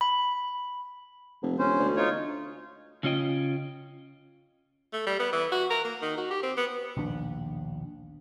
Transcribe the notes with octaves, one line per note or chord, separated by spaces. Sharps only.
B5
F1
E1 C#4 C5
D2
D#4 F4 C#5
C#3 C#4 F4 D#5 G5
A3
G3
B3
E3
F#4
A#4
A#3
D#3
F#4
G4
C4
B3
A#1 D#2 B2 D4